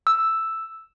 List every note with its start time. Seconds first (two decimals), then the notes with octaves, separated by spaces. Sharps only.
0.07 E6